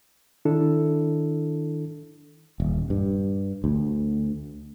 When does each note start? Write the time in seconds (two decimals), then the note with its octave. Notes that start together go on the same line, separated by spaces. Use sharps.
0.45 D#3 D4 E4 A4
2.60 D#1
2.90 G2
3.64 D2